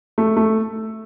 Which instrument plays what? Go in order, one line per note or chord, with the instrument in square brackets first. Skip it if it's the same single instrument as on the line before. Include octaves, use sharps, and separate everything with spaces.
[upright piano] A3
A3